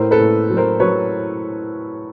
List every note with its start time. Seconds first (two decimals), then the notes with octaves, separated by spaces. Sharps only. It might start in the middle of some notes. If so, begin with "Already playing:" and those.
Already playing: A2 A#4 C5
0.11 A4 B4
0.19 A2
0.50 F#3
0.57 A#4 C5
0.80 F#3 B4 C#5